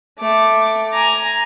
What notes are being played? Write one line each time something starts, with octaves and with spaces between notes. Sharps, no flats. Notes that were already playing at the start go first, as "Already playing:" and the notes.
A3 D6
G#5 A#5